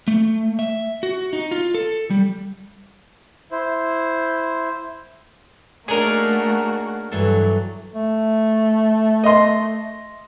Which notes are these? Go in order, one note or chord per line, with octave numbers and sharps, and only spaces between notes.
A3
E5
F#4
D#4
F4
A4
G3
E4 C5
A3 A#3 D4 D#4 F#4 G#4 A#4 C#5
G2 E3 F#3 A4
A3
D#5 C6